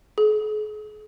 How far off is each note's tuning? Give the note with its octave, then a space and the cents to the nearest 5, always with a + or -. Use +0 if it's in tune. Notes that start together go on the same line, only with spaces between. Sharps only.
G#4 +45